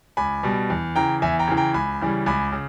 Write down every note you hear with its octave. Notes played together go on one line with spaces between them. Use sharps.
C#2 G#5 B5
B2 G3
E2
C#3 E3 G5 A#5
E2 E5 G#5
G5 A#5
C#3 E3
G5 A#5
C#2 G#5 B5
C#3 E3 G3
C#2 G#5 B5
C#3